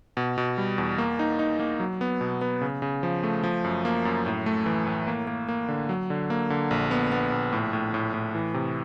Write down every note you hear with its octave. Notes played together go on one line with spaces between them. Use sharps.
B2
B2
G3
E2
A#3
D#4
D#4
A#3
F#3
B3
B2
B3
C#3
C#3
F3
A3
F3
F#2
A#3
F#2
A2
A3
E3
A2
A#3
A#3
A#3
D3
F#3
D3
A#3
D3
A#1
B3
B3
A#1
A2
A2
A2
A2
E3
C3